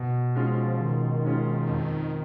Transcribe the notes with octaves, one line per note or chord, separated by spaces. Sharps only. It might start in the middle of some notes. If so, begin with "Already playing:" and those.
Already playing: B2
G#3 C#4 F4
F3
B2 D#3
G#3 C#4 F4
F2